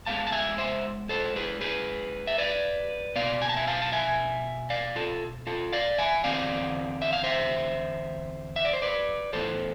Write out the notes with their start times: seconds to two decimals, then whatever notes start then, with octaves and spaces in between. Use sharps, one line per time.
0.06 G#2 G#3 B3 F5 A5
0.27 A5
0.32 E5 G#5
0.58 C5 E5
1.09 A4 C5
1.36 G#4 B4
1.61 G#4 B4
2.27 E5
2.38 B4 D5
3.16 B2 B3 D5 F5
3.42 G#5
3.49 A5
3.57 E5 G#5
3.67 F5 A5
3.82 A5
3.92 E5 G#5
4.70 D5 F5
4.96 F4 A4
5.47 F4 A4
5.72 D5 F5
5.98 E5 G#5
6.24 E2 D3 G#3 C4 D5 F5
7.02 E5
7.13 F5
7.24 C5 E5
8.56 E5
8.65 D5
8.73 C5
8.82 B4 D5
9.33 A2 E3 B3 A4 C5